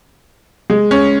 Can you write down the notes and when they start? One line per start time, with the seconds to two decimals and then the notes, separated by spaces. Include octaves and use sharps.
0.70 G#3
0.91 C#4